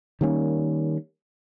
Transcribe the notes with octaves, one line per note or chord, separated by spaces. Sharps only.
D#3 G3 A#3 C#4